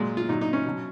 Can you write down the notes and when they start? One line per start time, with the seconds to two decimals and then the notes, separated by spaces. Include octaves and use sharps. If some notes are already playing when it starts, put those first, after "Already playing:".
Already playing: A#2 F#3 G#3
0.17 F4
0.29 A#2 F#3 D#4
0.41 D#4
0.53 C#4
0.65 B2 F#3